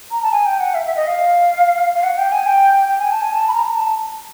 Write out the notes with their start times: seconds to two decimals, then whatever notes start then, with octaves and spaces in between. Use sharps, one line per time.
0.11 A#5
0.22 A5
0.32 G#5
0.46 G5
0.60 F#5
0.75 E5
0.86 E5
0.97 D#5
1.07 F5
1.96 F5
2.03 F#5
2.18 G5
2.32 G#5
2.46 G5
2.89 G5
2.99 G#5
3.11 A5
3.22 G#5
3.32 A5
3.48 B5
3.53 A#5
3.69 A#5
3.75 A5